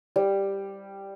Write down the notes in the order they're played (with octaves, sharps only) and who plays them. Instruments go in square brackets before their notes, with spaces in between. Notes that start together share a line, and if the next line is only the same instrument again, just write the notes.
[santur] G3